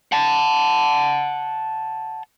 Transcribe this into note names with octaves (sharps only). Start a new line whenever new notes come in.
F#5 A5